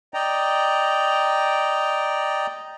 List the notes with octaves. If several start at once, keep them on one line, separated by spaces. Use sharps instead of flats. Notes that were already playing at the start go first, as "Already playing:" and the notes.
D5 D#5 G5 A#5